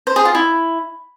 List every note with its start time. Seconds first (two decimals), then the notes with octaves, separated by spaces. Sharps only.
0.07 C5
0.16 G#4
0.25 F4
0.35 E4